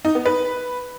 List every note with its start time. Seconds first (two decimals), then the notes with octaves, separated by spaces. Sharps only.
0.05 D#4
0.15 B3
0.26 B4